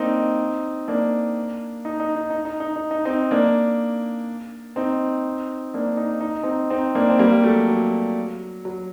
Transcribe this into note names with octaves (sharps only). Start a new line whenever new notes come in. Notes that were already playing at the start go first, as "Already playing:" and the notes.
Already playing: A#3 C4 D4 D#4
A#3 D4
D#4
D#4
D#4
D#4
D#4
D#4
D#4
D#4
C4 D#4
A#3 D4
C4 D#4
A#3 D4
D#4
D#4
C4 D#4
C4 D#4
A#3 D4
C4
G3 A#3
F#3 A3
F#3
F#3